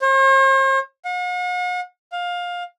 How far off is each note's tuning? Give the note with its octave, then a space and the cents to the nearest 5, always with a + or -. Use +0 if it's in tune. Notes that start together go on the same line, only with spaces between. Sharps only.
C5 +45
F#5 -45
F5 +20